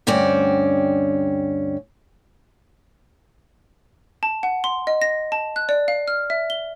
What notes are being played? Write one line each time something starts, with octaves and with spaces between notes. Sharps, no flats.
D2 G2 C4 C#4 D5
A5
F#5
C6
D#5
A#6
A5
F#6
D5
F5
F6
E5
G7